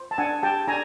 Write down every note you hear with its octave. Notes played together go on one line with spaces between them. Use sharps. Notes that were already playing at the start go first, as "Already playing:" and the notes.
Already playing: C5
A5
D4 F#5 G#5
G4 G5 A5
D4 G#5 A#5